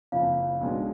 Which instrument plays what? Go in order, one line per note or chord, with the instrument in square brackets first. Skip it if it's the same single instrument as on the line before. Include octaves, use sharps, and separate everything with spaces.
[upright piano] F#1 F2 F3 [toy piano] F5
[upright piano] B1 B2 G#3 D4